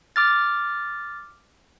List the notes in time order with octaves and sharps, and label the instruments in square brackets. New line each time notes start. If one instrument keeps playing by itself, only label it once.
[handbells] D6 F6 A6